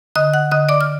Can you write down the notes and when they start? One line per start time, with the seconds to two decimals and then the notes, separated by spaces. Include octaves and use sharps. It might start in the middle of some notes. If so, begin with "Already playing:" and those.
0.15 D3 D#5 D#6
0.34 F#5 F#6
0.51 D3 D#5 D#6
0.69 D5 D6
0.81 F6